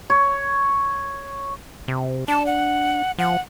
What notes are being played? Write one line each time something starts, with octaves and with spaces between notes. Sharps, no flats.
C#5
C3
D4 A5
F#5
F3 F#5